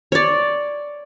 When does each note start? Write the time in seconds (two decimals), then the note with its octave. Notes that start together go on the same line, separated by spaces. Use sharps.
0.12 C#5 D5